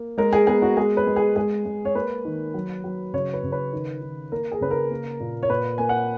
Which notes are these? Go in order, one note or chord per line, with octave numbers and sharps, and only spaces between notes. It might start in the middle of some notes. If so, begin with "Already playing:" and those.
Already playing: A#3
G#3 A#4
G#4
B3 G#4
F#4
G#3 G#4
B4
G#3
G#4
G#3 G#4
G#3
C#5
A#3 B4
D#3
F#3
F#3
C#3 C#5
B4
C#3
B4
D#3
D#3
A#3 A#4
G#4
C#3 B4
A#4
A#3
A#2
C#5
A#2 B4
A#3 G#5
F#5